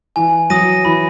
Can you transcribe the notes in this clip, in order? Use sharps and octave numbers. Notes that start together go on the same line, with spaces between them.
E3 G#5
F#3 D#6 A#6 D#7
E3 B5